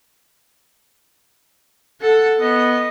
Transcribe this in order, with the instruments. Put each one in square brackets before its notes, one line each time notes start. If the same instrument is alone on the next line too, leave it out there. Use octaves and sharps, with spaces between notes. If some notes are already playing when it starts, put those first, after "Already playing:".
[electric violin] A4 F#5
[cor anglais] B3 [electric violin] D#5